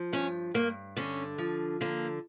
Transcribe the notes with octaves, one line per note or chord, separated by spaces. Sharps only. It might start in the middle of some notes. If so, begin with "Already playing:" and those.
Already playing: F3
G2 C#4
G2 A#3
D3 C#4
F3
D3 A#3